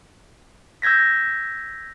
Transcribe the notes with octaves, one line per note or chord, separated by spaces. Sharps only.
E6 G6 G#6 A#6 B6